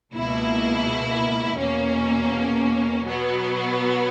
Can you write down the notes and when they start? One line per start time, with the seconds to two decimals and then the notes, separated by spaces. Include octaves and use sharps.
0.14 C#2 B2 A#3 E4
1.58 E2 B2 A#3 C#4
3.03 B2 F#3 B3